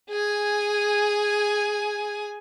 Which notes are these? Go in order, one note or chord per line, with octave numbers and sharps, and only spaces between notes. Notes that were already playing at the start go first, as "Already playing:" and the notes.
G#4 G#5